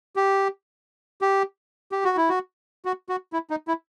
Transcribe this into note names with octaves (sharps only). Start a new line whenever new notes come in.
G4
G4
G4
F#4
E4
F#4
F#4
F#4
E4
D#4
E4